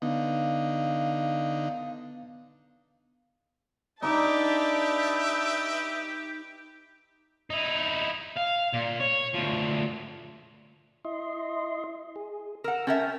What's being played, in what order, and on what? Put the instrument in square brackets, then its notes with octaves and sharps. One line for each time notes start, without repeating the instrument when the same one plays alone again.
[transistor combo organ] D3 D#4 [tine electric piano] B3 [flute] F5
[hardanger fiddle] D4 A5 [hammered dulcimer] D#4 D6 [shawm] G4 [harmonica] B4 D#5 E5
[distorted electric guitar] D#4 E4
F5
A#2
C#5
D2 F3
[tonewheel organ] E4 D#5 C6
G#4
[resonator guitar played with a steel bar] A#4 F#5 [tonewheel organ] E6
[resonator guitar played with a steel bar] C#4 A#4 E5 [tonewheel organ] G5 A5